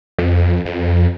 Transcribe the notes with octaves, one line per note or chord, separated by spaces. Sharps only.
F2
F2